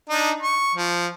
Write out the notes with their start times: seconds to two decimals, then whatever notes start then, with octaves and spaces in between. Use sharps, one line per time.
0.09 D4 D#4
0.43 C#6
0.75 F3